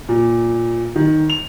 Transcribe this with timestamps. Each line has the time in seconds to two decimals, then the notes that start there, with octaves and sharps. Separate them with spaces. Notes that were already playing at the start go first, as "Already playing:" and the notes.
0.09 A#2
0.96 D#3
1.30 F7